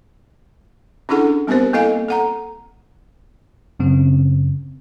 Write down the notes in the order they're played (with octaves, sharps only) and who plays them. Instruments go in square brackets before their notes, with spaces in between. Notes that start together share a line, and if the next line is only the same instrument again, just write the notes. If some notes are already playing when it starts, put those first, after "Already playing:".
[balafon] C#4 D4 E4 G#4 A4 F#5
G3 B3 C4 G4 A#4 C5
A#3 E4 A4 D#5 F5 G#5
A4 F#5 A#5
[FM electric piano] F#2 C#3 C4